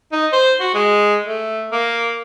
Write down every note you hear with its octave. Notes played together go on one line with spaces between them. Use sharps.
D#4
C5
F#4
G#3
A3
A#3